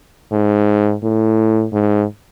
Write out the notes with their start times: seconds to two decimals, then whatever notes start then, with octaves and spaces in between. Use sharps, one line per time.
0.32 G#2
1.03 A2
1.73 G#2